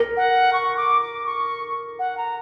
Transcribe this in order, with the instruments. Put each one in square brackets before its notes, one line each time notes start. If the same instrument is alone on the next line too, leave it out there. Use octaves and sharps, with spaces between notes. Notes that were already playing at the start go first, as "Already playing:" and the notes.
Already playing: [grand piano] A#4
[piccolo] F#5
C#6
D6
D6
C#6
F#5
A#5